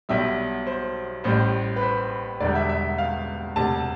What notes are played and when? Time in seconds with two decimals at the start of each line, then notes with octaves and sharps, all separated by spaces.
0.09 B1 B2 G3 E5
0.67 C5
1.24 A1 A2 G3 C5
1.76 B4
1.83 C5
2.40 E1 E2 D3 G3 D5
2.55 E5
2.69 E5
2.98 F5
3.56 E1 D2 C3 A5